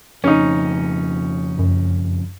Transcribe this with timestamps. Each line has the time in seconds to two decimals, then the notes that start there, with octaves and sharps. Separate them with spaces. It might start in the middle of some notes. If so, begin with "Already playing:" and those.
0.24 F2 C#3 C#4 D#4
1.59 F#2